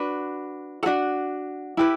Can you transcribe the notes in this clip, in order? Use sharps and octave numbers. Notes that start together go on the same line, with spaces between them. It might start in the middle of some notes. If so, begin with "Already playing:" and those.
Already playing: D4 F#4 B4
D4 F#4 A4 F#5
E4 G4 B4